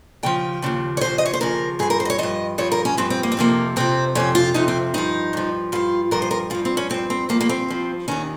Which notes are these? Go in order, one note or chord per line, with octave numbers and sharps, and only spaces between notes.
D#2 C#3 F3 G5
D#2 C#3 F3
C#5
D#2 C#3 F3 C5
D#5
C#5
C5
D#2 C#3 F3 A#4
G2 F3 G#4
A#4
C5
D#5
C#5
G2 F3 D#5
G2 F3 C#5
A#4
C#4
G2 F3 C4
C4
A#3
C4
F2 C3 F3 A#3
F2 C3 F3 C4
F2 C3 F3 C#4
F4
F2 C3 F3 D#4
C4
G2 F3 D#4
G2 F3
G2 F3 F4
G2 F3 A#4
C5
A#4
G2 F3 F4
C4
C#4
G2 F3 C4
C4
G2 F3 A#3
A#3
C4
G2 F3
D#2 D#3 C#4